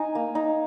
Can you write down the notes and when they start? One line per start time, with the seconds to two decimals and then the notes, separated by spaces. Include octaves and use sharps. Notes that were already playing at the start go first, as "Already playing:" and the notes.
Already playing: D#4 G#5
0.15 A#3
0.35 D#4